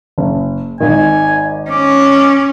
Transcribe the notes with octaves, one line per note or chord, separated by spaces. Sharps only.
F#1
G#1 D#3 G#5
C#4 D6